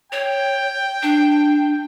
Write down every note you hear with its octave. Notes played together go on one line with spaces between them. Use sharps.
C#5 G5
D4